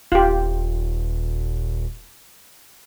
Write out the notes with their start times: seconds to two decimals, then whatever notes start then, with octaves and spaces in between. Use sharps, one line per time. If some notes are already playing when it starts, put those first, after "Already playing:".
0.12 D#1 F4 G4